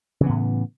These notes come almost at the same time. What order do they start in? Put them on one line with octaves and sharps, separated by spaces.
C#3 E3 B3 A2